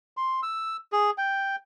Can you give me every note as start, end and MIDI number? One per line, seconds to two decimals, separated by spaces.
0.17 0.40 84
0.43 0.77 88
0.92 1.11 68
1.18 1.56 79